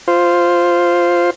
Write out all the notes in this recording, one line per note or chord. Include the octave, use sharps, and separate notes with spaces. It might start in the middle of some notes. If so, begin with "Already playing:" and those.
F4 C5